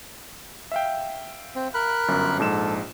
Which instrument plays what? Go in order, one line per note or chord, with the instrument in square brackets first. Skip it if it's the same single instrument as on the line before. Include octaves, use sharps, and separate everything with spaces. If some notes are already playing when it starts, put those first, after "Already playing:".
[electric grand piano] E5 F5 G5
[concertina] C4
A#4 B5 F#6
[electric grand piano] G1 F#2
[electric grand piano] A#1 G#2 E7 [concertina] A4